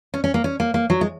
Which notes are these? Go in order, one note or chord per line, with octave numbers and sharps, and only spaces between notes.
C#4
C#4
A#3
C#4
A#3
A#3
F#3
G#3